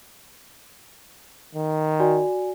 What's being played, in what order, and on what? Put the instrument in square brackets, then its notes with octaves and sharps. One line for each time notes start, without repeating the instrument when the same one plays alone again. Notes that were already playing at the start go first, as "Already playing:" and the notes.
[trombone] D#3
[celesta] F#4 D5 G#5